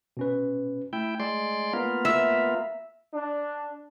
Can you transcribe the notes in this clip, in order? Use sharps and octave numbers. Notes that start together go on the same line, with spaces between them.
B2 C#4 B4
A3 E4 G5
G#3 D5 C6
A#3 B3 F4
E5
D4